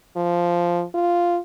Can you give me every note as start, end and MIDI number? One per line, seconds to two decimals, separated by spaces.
0.16 0.83 53
0.94 1.39 65